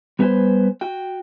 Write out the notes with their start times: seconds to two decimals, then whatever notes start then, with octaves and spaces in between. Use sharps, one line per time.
0.19 G3 B3 G#4 B4 C5 G#5
0.81 F#4 G5